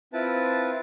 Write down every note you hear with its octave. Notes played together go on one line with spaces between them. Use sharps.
C4 E4 F4 B4 A5